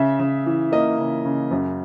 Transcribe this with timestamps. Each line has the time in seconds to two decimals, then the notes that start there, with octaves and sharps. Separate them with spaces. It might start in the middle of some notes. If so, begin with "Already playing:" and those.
Already playing: C#3 E5
0.19 C#3
0.46 E3
0.72 A#3 D#5
0.99 C#3
1.25 C#3
1.51 F#2